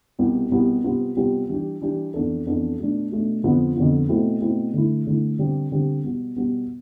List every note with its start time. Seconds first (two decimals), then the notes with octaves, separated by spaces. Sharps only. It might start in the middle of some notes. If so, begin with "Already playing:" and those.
0.19 C2 B2 B3 E4 G4
0.52 C2 B2 B3 E4 G4
0.84 C3 G3 B3 F4
1.16 C3 G3 B3 F4
1.49 E3 G3 D4 G4
1.82 E3 G3 D4 G4
2.14 F2 E3 B3 D4 A4
2.46 F2 E3 B3 D4 A4
2.79 B2 A3 D4
3.12 B2 A3 D4
3.44 F2 D3 F3 B3 F4
3.76 F2 D3 F3 B3 F4
4.09 B2 A3 C4 E4
4.41 B2 A3 C4 E4
4.74 D3 A3 E4
5.07 D3 A3 E4
5.39 D3 G3 C4 G4
5.72 D3 G3 C4 G4
6.04 B2 G3 B3
6.36 B2 G3 B3